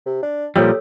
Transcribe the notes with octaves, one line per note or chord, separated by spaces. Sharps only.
C3
D4
A#2 F3 G3 G4 A4 C#5 E6